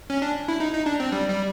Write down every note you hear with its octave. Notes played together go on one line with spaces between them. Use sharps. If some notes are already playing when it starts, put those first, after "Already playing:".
C#4
D4
E4
D#4
D#4
D4
C4
G3
G3